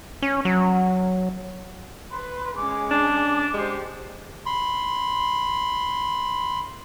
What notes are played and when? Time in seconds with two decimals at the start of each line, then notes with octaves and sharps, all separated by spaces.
0.22 C#4
0.45 F#3
2.11 B4 C6
2.56 G#3 C#4 D6
2.91 D4
3.54 G#3 G4 C5
4.46 B5 C6